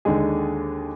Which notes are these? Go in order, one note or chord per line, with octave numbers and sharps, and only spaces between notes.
D#2 D3 G#3 D#4 G#4